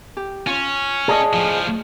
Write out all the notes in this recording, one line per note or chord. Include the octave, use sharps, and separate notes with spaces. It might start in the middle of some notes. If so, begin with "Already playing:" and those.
G4
C#4 F4
G#4 D5 D#5 A5
A2 F3